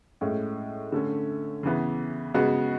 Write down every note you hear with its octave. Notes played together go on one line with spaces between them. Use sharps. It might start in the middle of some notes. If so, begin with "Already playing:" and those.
A2 G#3 C#4
D3 A3 C#4
C#3 E3 B3
C#3 G#3 B3 F#4